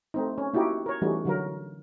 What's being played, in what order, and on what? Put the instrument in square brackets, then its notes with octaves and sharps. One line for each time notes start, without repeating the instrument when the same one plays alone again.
[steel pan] A3 C4 D#4
C#4
A#3 D#4 E4 F#4 G4
A#4 C#5
E3 G3 A3 C#4 D#4 F#4
D3 F#3 A#4